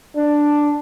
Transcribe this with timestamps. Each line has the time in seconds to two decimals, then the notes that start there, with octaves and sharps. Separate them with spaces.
0.16 D4